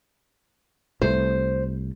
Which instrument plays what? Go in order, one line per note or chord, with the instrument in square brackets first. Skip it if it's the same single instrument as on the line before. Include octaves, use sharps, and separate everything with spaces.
[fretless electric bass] C2 A3 [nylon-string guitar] C5